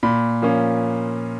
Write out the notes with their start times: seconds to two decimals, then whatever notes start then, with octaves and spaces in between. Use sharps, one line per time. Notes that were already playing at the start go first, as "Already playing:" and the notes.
0.03 A#2 B5
0.42 F3 A#3 C#4